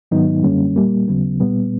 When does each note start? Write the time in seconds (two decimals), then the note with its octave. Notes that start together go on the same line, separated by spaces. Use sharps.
0.11 G#2 D#3 F#3 B3 D#4
0.44 F#2 D3 G3 A#3 C#4
0.76 A#2 G3 A#3
1.08 D#2 C#3 F#3 B3
1.40 A#2 G3 B3